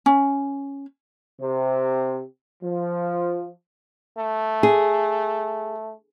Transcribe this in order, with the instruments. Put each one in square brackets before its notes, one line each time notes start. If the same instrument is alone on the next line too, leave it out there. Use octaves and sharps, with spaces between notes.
[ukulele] C#4
[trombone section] C3
F3
[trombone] A3
[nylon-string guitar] G#4